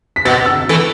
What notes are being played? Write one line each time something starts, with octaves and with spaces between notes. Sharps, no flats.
B6
B2 A6
E6
E3 A3